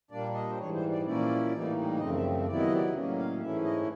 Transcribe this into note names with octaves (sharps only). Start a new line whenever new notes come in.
A#2 G3 A#3 D4 D5
D#5
C5
G#2 E3 G3 C#5
C5
D5
A#2 F3 A#3 C#4 E4 D5
A2 E3 G3 A#3 D#4
F#2 C#3 F3 A3 C4 D#5
E5
C3 D#3 F#3 B3 E4 D5
D#5
D5
A2 F#3 A#3 C#4
F5
G#2 E3 A3 C#4 E4 E5
D#5